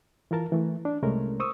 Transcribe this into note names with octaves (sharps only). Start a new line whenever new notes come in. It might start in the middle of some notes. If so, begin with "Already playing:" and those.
E3 F4 A#4 A5
E3 A3
D4
C2 C3 G#3 A3 C#4 A#4
C5 C#6 D#6 E6